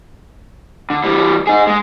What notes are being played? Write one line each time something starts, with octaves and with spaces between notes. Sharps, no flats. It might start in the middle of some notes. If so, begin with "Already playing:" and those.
D3
E3 G3
D#4 G#4
G#3